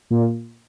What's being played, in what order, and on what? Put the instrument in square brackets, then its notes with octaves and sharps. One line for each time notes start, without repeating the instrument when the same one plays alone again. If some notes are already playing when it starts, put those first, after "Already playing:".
[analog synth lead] A#2